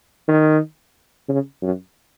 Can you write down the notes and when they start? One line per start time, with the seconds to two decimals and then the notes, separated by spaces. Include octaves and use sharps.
0.28 D#3
1.28 C#3
1.62 F#2